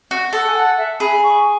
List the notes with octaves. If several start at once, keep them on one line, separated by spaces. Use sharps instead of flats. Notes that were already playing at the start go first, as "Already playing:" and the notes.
F#4
A4 F#5
G#5
F#5
E5
G#4 B5
C#6